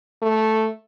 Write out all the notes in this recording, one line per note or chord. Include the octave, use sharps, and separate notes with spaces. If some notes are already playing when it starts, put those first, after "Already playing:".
A3